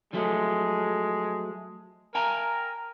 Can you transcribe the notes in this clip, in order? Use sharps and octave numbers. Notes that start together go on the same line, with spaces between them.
F3 F#3 G#3 A3
A#4 G5 G#5 A#5